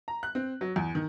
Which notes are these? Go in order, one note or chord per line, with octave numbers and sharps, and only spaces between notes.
A#5
F#6
C4
F#3
E2
D#3